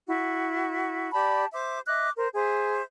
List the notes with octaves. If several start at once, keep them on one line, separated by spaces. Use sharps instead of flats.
E4 F#4
G4 D5 A5 B5
C5 E5 D6
D#5 E5 D6 F#6
A#4 C5
G#4 C5 E5